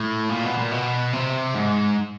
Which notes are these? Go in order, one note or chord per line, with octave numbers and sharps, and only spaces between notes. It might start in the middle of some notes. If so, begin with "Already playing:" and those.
Already playing: A2
A#2
B2
A#2
B2
C3
G#2